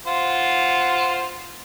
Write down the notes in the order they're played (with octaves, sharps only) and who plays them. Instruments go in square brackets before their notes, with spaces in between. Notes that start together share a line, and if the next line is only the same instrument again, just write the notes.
[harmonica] F4 C5 F#5